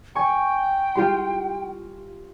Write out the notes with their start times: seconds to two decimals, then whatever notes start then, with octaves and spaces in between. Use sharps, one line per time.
0.15 G5 G#5 C#6
0.95 F4 G4 C6